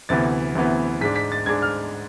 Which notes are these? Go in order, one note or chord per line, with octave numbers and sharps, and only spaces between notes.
D2 C3 E3 B3 A6
D2 C3 E3 B3
G#2 G#3 D4 B6
B6
A6
G#2 G#3 D4 G#6
F6